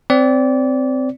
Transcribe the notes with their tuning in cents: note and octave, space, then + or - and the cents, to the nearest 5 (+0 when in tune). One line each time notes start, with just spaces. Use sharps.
C4 -10 D5 -25